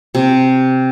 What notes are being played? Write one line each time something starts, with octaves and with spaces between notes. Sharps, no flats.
C3